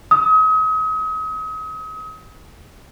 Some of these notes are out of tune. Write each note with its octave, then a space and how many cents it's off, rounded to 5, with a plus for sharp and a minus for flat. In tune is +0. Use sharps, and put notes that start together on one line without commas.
D#6 +40